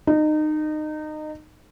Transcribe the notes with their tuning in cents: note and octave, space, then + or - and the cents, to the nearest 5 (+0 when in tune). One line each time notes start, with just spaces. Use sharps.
D#4 -25